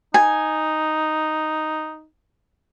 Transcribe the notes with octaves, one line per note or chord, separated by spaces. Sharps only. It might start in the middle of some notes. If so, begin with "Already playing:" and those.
D#4 G#5